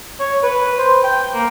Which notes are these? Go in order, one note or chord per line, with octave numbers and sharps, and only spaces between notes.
C#5
B4
C5
G5
A#3